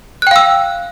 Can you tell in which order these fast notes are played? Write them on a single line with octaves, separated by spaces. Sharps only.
F#6 G5 F5 E6